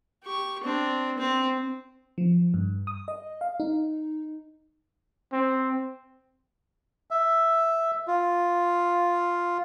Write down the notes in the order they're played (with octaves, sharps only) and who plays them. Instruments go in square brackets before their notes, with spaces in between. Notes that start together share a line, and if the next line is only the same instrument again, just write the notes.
[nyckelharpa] G4 C#6
C4 D4
C4
[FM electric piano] F3
G2
D#6
D#5
F5
D#4
[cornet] C4
[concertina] E5
F4